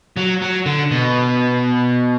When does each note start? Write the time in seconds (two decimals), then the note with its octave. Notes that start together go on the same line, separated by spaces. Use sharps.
0.16 F#3
0.42 F#3
0.66 D3
0.91 B2